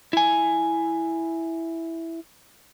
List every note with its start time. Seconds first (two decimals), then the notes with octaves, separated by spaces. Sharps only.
0.13 E4 G#5